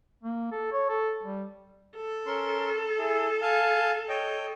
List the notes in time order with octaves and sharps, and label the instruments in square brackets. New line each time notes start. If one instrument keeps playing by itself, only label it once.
[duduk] A#3
A4
C#5
A4
G3
[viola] A4
[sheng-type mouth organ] C#4 A#4 C6
E4 G#4
F5 G#5 A5
C#5 D#5 G5